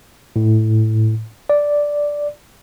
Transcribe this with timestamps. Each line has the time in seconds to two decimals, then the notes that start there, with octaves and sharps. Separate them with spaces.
0.36 A2
1.50 D5